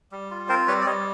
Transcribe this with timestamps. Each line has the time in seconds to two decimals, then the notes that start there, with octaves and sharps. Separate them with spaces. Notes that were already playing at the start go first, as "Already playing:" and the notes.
0.12 G3
0.31 F4
0.49 C4 A#4 C5
0.67 G3 B4 C#5
0.82 D5
0.86 G3 C#5 D#5